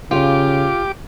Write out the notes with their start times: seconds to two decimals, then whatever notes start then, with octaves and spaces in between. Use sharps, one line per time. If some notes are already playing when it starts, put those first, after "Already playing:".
0.11 C#3 F4 G4 D6